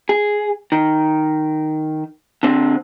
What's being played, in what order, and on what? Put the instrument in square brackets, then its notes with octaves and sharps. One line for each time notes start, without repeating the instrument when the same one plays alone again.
[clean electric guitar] G#4
D#3
D3 C4